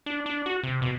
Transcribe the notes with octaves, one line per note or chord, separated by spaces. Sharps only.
D4
D4
F#4
C3
B2